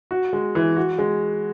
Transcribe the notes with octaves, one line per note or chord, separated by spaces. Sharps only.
F#4
G#3
E3
F#4
G#3